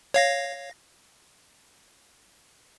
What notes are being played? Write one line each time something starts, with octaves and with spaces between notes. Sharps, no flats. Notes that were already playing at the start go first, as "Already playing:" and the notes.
C#5 F5 A#6